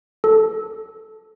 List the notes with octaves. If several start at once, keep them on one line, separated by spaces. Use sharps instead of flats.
A4